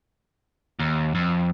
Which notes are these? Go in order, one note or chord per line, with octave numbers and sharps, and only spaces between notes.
D#2
F2